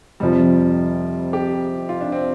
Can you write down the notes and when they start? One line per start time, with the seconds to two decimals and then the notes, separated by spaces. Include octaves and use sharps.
0.20 F2 C3 F3 G3
1.33 G4
1.89 F4
2.01 D4
2.12 C4